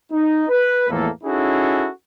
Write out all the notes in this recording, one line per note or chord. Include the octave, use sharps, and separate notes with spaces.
D#4
B4
E2 A2 F3 A#3 A4
C#4 D#4 E4 F#4 G#4 A4